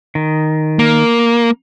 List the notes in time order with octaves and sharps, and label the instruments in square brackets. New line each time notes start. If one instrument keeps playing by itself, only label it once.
[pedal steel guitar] D#3
[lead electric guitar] A#3